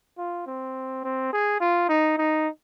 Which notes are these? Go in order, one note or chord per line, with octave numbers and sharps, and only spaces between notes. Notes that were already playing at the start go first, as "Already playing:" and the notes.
F4
C4
C4
G#4
F4
D#4
D#4